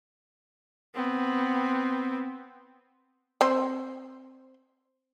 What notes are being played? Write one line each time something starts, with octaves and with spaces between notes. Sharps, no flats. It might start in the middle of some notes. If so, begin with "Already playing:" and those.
B3 C4
C4 C5